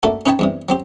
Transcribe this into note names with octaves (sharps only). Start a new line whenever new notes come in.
A3 A#3 D4 F#4 A4
C#4 D#4 B4 C#5 G5 A5
E2 G2 C3
F#3 C4 G4